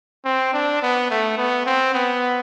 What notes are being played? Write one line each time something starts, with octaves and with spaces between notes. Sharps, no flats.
C4
D4
B3
A3
B3
C4
B3